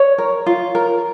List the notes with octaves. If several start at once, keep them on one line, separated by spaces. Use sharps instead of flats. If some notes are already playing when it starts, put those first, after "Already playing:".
Already playing: C#5
A#4
F4
A#4